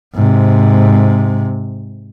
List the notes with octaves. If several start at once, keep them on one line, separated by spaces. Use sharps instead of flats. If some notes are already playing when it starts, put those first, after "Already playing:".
G#2 C3